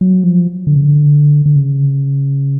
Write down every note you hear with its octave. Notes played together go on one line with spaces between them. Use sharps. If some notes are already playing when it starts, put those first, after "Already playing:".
F#3
F3
D3
C#3
D3
D3
C#3